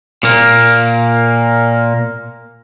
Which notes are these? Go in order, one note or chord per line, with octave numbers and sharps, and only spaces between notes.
A#2 A#3